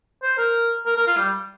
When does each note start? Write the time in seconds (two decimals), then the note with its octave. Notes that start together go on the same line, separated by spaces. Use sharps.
0.23 C5
0.38 A#4
0.86 A#4
0.97 A#4
1.07 F4
1.17 G3